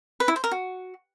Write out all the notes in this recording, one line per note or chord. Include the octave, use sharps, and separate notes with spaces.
B4
E4
C5
A#4
F#4